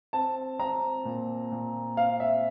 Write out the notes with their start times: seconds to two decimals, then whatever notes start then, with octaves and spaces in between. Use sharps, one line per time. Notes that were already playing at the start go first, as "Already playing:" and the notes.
0.13 C4 A5
0.59 C4 A#5
1.05 A#2
1.51 A#2
1.97 C4 F5
2.20 E5